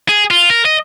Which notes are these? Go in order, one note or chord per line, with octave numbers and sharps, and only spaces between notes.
G#4
F4
A#4
D#5